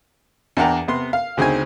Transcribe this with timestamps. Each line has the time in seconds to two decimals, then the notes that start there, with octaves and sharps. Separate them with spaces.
0.57 E2 D4 D5 F#5 G5 A#5
0.88 C3 B3 C6
1.13 F5
1.37 D2 C#3 C4 D#4 G#5